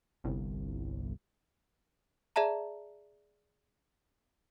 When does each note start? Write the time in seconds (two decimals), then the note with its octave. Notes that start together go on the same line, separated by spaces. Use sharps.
0.24 G1 C2
2.36 G#4 D5 E5 A5 A#5